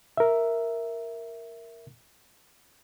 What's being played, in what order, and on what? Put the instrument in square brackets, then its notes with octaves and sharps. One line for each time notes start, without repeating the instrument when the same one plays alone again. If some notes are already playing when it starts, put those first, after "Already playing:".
[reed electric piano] A#4 E5